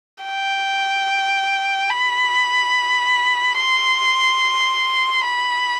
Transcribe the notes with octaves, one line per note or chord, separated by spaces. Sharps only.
G5
B5
C6
B5